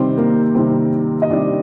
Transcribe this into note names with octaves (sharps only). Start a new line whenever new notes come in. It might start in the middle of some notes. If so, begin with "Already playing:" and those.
Already playing: C3 D#3 G3 C4 C5
A#3 A#4
C3 D#3 G3 C4 C5
D#5
C3 D#3 G3 D4 D5